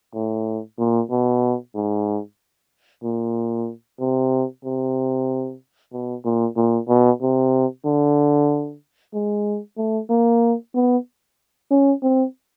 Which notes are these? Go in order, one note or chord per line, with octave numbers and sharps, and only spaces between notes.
A2
A#2
B2
G#2
A#2
C3
C3
B2
A#2
A#2
B2
C3
D3
G#3
A3
A#3
B3
C#4
C4